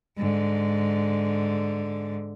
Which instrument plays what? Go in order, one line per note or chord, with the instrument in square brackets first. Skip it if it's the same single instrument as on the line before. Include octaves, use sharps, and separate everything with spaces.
[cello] G#2 D3